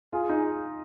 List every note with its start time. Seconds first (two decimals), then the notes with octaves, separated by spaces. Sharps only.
0.13 F4 G#4
0.29 D#4